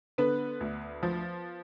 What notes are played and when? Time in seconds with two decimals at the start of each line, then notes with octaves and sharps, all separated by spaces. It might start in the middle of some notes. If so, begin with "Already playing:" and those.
0.18 D3 B3 B4
0.61 D2
1.03 F3